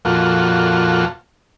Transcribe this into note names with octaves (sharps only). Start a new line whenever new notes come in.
F2 A#2 F4 F#4 A4